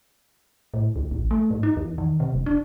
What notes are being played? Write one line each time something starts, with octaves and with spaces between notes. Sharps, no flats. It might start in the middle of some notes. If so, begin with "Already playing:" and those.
A2
D2
A1
A3
G#2
D#4
E2
D#3
C3
E1
D4